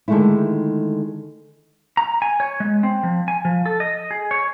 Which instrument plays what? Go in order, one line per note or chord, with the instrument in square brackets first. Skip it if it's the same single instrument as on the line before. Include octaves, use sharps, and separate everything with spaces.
[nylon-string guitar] D3 D#3 G#3 A3 D#4 E4
[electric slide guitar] A#5
G#5
C#5
G#3
C4
F3
G#5
F3
A4
D#5
G#4
C#5